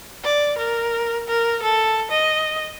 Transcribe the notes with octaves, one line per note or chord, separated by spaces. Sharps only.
D5
A#4
A#4
A4
D#5